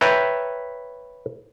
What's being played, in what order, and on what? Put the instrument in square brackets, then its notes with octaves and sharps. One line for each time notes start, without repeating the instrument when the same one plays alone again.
[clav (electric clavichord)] B4 C#5 E5 G5 A5 A#5